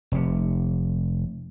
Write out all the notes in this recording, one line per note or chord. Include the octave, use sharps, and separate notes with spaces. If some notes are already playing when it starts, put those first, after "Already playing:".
F1 C3